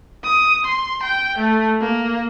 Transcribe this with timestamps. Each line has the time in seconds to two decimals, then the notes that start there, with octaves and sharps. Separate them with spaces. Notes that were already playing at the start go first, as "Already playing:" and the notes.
0.24 D#6
0.65 C6
1.02 G5
1.38 A3
1.81 A#3